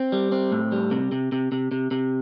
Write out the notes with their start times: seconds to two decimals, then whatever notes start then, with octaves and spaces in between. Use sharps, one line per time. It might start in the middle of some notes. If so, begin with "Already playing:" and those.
Already playing: C4
0.12 G3
0.32 C4
0.52 A2
0.72 G3
0.91 C3
1.12 C3
1.32 C3
1.52 C3
1.72 C3
1.91 C3